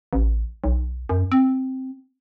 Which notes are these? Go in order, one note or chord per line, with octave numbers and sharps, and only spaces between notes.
A1
B1
F#2
C4